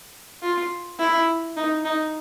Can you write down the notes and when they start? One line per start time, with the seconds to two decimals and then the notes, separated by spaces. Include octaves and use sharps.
0.42 F4
0.99 E4
1.57 D#4
1.85 D#4